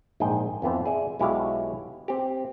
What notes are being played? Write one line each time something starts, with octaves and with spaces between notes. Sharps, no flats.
A#1 G#2 D#5 G5 G#5
F2 E3 B3 C4
G#4 D5 E5
B1 G#3 E4 F#4 G4 F5
C4 G4